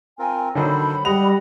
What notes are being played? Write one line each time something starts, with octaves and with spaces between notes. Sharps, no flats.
C4 F4 A#4 G#5
D3 D#3 F#3 A4 C5 B5
G3 D#5 F#5 F7